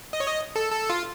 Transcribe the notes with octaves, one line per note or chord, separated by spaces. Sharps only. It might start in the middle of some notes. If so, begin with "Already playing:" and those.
D#5
C#5
D#5
A4
A4
F4